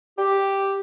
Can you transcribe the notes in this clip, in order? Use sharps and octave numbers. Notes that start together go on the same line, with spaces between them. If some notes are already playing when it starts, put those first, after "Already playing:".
G4